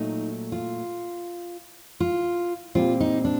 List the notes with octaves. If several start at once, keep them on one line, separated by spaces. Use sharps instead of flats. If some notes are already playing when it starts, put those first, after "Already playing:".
Already playing: A#2 F#3 A3 D#4
F4
F4
A#2 G3 C4 F4
D#4
D4